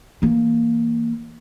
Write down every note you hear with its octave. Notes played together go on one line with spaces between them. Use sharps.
E3 A#3